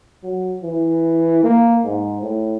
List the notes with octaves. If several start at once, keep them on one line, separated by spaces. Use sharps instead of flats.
F#3
E3
A#3
G#2
A2